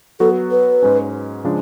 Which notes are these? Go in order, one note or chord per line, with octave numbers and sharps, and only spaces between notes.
F#3 B3 F#4 A4
B4
G#2 G#3 C#4
C#3 F3 G#3 D4